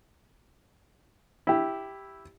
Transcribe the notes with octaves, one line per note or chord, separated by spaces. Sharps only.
E4 G4